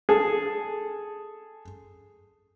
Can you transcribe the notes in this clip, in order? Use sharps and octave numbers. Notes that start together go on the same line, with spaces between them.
G#4 A4